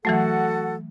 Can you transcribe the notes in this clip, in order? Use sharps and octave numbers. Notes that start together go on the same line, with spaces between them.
E3 F#3 A3 F#4 A4 F#5